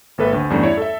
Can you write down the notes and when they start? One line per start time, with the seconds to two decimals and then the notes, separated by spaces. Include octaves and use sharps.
0.18 G#1 A#3 A4 B4 E5
0.33 D2
0.50 E2 G2 G3 A3 C#4
0.63 E4 C#5 D5
0.77 A4 E5